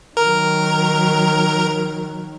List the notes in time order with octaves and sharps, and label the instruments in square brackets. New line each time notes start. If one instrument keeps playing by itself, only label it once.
[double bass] D#3 F#3 [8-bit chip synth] A#4